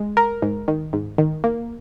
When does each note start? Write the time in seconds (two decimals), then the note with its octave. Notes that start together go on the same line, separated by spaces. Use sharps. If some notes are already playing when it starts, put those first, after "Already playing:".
Already playing: G#3
0.17 A#4
0.42 G#2
0.68 D#3
0.93 G#2
1.18 D#3
1.44 A#3